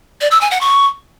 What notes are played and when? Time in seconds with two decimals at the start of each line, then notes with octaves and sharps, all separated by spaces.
0.21 D5
0.31 E6
0.41 G#5
0.51 F#5
0.61 C#6